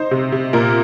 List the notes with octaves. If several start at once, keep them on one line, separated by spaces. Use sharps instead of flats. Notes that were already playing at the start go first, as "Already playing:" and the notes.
Already playing: D#4 C5
C3
C3
A#2 A#4